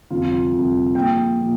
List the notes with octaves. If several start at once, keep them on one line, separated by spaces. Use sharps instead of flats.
G1 F2 C3 F4
G1 F2 C3
A#1 A#2 F3 G5
A#2 F3